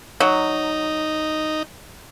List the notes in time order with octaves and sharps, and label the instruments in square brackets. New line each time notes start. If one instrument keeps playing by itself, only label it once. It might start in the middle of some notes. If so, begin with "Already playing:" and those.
[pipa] F#3 [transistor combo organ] D#4